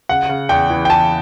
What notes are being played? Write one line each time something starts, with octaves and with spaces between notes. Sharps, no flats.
C#3 F#5
C#3
E2 G5
E3
G5
E3 A5